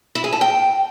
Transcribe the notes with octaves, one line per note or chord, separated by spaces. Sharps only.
E4
G#4
A4
G5